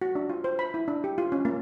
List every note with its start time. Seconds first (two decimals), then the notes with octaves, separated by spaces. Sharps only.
0.02 F#4
0.15 D4
0.29 F4
0.44 C5
0.59 B5
0.74 E4
0.88 D4
1.04 G4
1.18 F4
1.32 C#4
1.45 A#3